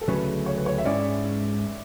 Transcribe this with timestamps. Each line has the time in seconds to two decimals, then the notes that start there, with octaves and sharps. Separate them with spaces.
0.01 A4
0.08 D2 C#3 F#3 A3 C#4 B4
0.46 C#5
0.57 B4
0.66 C#5
0.78 E5
0.85 G#2 G#3 C#4 E4 D5